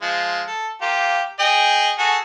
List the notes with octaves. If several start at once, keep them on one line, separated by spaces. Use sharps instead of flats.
F3 G#3
A4
A#3 F4 G4
G#4 D#5 G5
F#4 G#4 A4